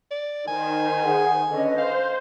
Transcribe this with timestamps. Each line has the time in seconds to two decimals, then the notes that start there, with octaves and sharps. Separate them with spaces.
0.11 D5
0.48 D#3 C5 G#5
1.03 G#4 F#5
1.49 D3 C#4 B4 D#5
1.78 C5 F5